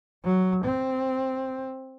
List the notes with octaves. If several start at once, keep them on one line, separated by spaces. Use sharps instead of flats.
F#3
C4